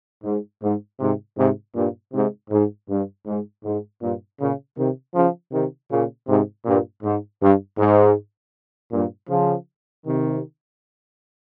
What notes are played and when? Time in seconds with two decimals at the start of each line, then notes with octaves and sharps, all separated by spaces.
0.24 G#2
0.62 G#2
0.99 G#2 C3
1.37 G#2 C3
1.75 G2 A#2
2.13 G#2 C3
2.50 G#2
2.88 G2
3.26 G#2
3.64 G#2
4.01 G2 A#2
4.39 A#2 C#3
4.76 C3 D#3
5.14 C#3 F3
5.52 C3 D#3
5.90 A#2 C#3
6.28 G#2 C3
6.65 G2 A#2
7.03 G#2
7.41 G2
7.78 G#2
8.92 G2 A#2
9.29 C#3 F3
10.05 C3 D#3